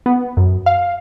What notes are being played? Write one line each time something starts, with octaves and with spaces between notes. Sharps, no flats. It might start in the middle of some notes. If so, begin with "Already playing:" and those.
B3
F#2
F5